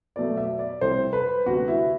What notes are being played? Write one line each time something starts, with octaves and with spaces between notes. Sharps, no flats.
B2 F#3 A3 D5
E5
D5
C2 C3 G3 C4 C5
B4
D2 C3 G3 B3 F#4
E4